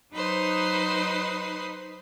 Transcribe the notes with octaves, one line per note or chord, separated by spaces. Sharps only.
F#3 D#4 B4 C5 D#6